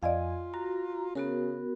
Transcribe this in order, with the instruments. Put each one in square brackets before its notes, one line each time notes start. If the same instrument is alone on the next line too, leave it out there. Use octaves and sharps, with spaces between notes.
[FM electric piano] F2 G#5 [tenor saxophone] F4 [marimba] D5 D#5 F5
[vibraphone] F#4 [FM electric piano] A#5
[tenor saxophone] C#3 [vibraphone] B3 F#4 A#4 [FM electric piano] C#4